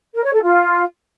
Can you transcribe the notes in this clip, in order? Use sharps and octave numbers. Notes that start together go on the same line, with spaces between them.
A#4
C#5
A4
F4